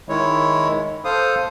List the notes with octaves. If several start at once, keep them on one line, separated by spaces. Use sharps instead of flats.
D#3 G#3 E4 C#5
A4 C5 F5 D#6